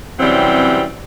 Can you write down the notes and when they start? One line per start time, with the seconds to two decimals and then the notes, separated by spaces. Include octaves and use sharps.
0.19 C3 E3 F#3 G3 C4 C#4